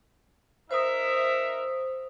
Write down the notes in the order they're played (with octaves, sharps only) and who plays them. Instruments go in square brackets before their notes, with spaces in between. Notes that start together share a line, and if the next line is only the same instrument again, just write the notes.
[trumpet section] D#4 A#4 E5 [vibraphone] C5 D#6